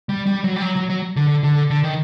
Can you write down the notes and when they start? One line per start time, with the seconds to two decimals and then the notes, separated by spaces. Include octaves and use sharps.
0.09 G3
0.27 G3
0.44 F#3
0.56 G3
0.62 F#3
0.76 F#3
0.90 F#3
1.16 D3
1.43 D3
1.70 D3
1.84 D#3